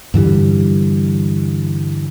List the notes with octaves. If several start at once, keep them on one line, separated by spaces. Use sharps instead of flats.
G2 D3 E3 G3